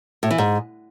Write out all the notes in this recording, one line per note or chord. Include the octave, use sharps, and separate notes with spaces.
A2
E3
G#2